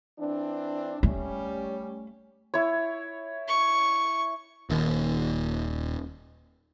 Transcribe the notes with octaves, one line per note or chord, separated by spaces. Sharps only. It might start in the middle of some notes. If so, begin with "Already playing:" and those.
E3 C4 D4
G3 A3 C#4
E4 C#5
C#6
D#1 D#2